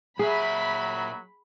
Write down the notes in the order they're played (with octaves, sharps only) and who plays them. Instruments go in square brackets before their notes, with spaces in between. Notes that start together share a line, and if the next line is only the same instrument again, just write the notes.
[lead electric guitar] A#2 E5 [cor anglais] F#3 [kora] G#4 [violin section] B5